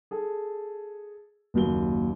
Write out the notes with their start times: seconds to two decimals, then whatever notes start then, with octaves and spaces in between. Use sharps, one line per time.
0.11 G#4 A4
1.54 F#1 D#2 F#3 G7